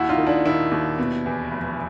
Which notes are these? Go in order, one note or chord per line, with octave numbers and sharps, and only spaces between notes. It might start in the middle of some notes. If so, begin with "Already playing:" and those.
Already playing: D#2 E4 F#4
D#4 F4
D#3
D4 E4
D#3 D4 E4
D#2
B2
E2
F1